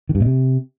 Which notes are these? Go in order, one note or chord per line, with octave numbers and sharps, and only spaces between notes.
D#3
G2
A#2
C3